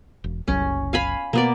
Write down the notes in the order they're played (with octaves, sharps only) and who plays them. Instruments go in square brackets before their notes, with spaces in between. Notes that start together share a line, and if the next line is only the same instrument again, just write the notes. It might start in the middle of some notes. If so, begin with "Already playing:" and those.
[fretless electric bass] E1
[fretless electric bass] F#1 C2 F#3 [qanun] C#4
[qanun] F5 G#5 B5
[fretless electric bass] B2 [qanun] A#3 B3 D5